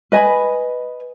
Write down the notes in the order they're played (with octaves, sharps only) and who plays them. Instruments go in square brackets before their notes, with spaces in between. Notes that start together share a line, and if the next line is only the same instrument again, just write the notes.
[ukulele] B4 D#5 G#5 B5